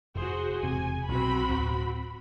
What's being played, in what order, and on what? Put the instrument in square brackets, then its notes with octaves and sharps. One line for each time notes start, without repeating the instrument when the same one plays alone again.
[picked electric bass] F1 [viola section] F#4 G#4 C5
[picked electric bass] E1 C3 [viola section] G#5
[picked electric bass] B1 [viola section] C4 F#4 B5
[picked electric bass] D1